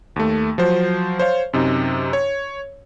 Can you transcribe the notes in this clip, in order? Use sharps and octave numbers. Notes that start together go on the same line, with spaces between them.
D#2 A3
F3 F#3 C5
C5 C#5 F5
F#2 C3 D#4
C#5